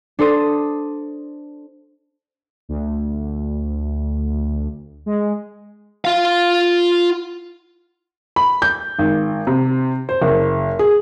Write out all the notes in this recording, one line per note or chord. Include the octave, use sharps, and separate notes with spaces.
D4 A4 C5 D#6 D#7
D2
G#3
F4 F5
B5
G6
G#1
C3
C5
F#1
G#4